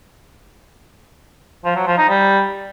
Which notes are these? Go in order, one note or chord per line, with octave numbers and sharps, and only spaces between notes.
F3
F#3
F3
D#4
G3